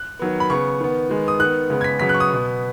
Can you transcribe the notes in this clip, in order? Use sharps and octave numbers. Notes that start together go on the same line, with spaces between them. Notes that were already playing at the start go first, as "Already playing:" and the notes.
Already playing: F#6
D#3 F#3 B3
B5
C#3 B3 C#6
D#3 B3
D#3 G#3 B3
D#6
D#3 B3 F#6
C#3 G#3 B3
G#6
B6
C#3 F#3 B3 B6
F#6
C#6
D#6
B2 B3